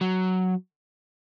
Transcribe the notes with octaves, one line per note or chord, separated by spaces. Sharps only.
F#3